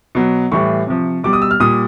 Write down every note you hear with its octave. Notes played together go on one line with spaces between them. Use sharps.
B2 F#3
A2 E3 G3 C#6
C3 F3
B2 G3 D6
D#6
E6
F6
A#2 G3 D#6